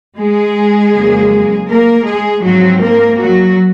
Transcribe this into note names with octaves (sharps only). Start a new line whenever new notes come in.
G#3 G#4
F2 C#3 F#3 A#3
A#3 A#4
G#3 G#4
G#2 F3 F#3 C4 F#4
A#3 A#4
F#3 F#4